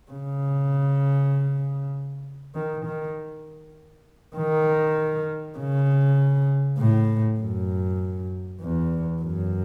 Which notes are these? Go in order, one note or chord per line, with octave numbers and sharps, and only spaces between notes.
C#3
D#3
D#3
D#3
C#3
A2
F#2
E2
F#2